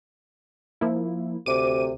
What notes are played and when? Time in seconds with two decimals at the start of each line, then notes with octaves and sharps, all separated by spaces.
0.81 F3 A#3 E4
1.46 D2 C3 D6 D#7